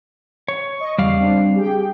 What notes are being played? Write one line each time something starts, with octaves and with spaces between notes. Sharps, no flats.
C#5
D#5 C#6
E2 C#3 G3 D5 F5
C4 D4
G4 G#4 G5